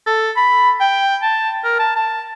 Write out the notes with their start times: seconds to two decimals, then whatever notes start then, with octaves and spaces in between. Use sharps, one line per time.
0.07 A4
0.36 B5
0.81 G5
1.23 A5
1.65 A#4
1.79 A5
1.96 A5